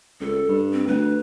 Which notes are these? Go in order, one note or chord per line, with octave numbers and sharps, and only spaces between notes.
C#2 A4
G2
C4
D2 B4